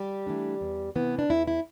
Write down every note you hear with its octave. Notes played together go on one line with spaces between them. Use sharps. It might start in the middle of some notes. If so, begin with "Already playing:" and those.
Already playing: G3 G4
E3 A3 D4
E2
C3 E3 B3
D4
E2 E4
E4